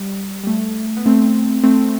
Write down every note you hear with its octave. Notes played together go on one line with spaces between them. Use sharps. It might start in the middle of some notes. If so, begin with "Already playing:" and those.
Already playing: G3
G3
A3
B3
A3 C4
A3 C4